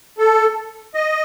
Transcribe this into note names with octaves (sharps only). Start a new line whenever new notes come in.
A4
D#5